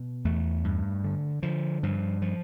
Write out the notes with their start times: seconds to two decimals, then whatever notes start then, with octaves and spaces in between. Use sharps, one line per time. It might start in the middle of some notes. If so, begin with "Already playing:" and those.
Already playing: B2
0.25 E2 A3
0.64 G2
1.04 D3
1.43 D3 F3
1.83 G2 F3
2.22 F3